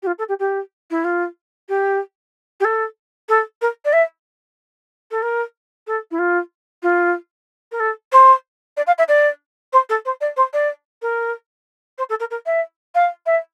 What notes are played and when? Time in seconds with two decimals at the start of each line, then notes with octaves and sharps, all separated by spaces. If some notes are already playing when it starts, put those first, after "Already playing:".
0.02 G4
0.07 F4
0.18 A4
0.28 G4
0.39 G4
0.90 E4
1.04 F4
1.69 G4
2.60 G4
2.64 A4
3.29 A4
3.61 A#4
3.85 D5
3.93 E5
5.11 A4
5.22 A#4
5.87 A4
6.11 E4
6.19 F4
6.82 F4
7.71 A#4
7.80 A4
8.12 C5
8.77 D5
8.87 F5
8.98 E5
9.08 D5
9.73 C5
9.89 A4
10.05 C5
10.21 D5
10.36 C5
10.53 D5
11.02 A#4
11.98 C5
12.09 A4
12.20 A#4
12.30 A#4
12.46 E5
12.95 F5
13.26 E5